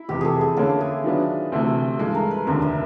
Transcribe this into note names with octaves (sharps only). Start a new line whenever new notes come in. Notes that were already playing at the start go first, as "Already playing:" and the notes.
Already playing: E4
F1 E2 C3 F3 G4
G#4 A4
G#4
D3 F3 A#3 C#4 F4 A4
G#4
D#3 F#3 B3 D4 F4
D2 C3 E3 A3
G2 E3 G#3 A4
A#4
B4
F1 D#2 D3 A#4
E5